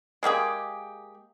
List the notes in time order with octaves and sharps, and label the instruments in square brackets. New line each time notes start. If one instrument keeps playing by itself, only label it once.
[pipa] G#3 A#3 G4 G#4